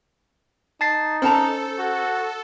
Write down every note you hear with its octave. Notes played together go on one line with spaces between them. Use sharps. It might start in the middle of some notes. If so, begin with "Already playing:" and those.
D#4 A5 A6 C7
C#4 A4 C5 A5 A#5
F#4